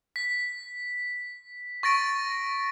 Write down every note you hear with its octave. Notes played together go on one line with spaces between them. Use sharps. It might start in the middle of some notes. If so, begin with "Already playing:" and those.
B6
C#6 A6 A#6 D7